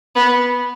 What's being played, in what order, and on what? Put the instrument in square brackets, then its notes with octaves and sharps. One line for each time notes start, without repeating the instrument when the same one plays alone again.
[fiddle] B3